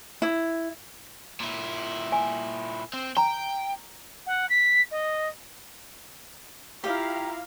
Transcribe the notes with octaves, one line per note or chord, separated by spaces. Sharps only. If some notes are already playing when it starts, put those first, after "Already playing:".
E4
A#2 E4
G#5
C4
G5 A#5
F#5
B6
D#5
E4 F4 G4 F5 A#5